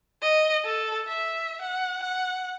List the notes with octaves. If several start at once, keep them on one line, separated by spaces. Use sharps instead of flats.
D#5
A4
E5
F#5
F#5